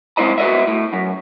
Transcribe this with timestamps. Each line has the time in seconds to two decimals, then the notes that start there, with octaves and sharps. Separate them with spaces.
0.17 G#3 C4 E4 C5 D#5 A#5
0.38 F#4 B4 C#5 D#5 E5
0.67 A2
0.93 F#2